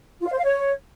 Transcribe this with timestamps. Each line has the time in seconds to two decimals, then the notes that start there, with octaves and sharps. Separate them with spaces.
0.21 F4
0.27 F5
0.32 C5
0.38 F5
0.44 C#5